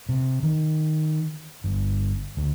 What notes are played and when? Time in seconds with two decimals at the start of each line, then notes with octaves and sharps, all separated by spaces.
0.09 C3
0.43 D#3
1.64 G1
2.37 D2